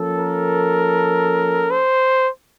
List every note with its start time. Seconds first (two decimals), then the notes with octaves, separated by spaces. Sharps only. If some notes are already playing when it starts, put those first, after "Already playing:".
Already playing: F3 A#3 C#4 A4
0.18 A#4
1.71 C5